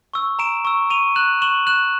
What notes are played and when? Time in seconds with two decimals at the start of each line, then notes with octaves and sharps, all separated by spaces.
0.14 C#6 E6
0.39 A#5 D7 E7
0.65 C#6 E6
0.90 C#6 D#7 F7
1.15 F#6 E7 F#7
1.42 C#6 E7 F#7
1.67 F#6 E7 F#7